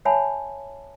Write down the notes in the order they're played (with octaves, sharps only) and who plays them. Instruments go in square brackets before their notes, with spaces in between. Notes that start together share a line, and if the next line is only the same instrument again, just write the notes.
[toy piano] C#5 E5 F#5 G#5 A5 B5